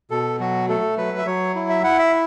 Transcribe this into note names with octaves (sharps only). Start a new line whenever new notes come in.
B2 A4
F#3 F#4
A3 A4
F#3 B4
E5
F#3 C#5
E4
E5
E4 F#5
E5